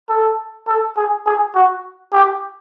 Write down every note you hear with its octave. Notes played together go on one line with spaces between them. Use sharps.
A4
A4
G#4
G#4
F#4
G4